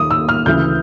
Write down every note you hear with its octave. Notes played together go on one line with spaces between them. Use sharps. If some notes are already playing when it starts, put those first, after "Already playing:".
Already playing: D#2 D#3 D#6
E6
F6
D2 C#3 E3 G6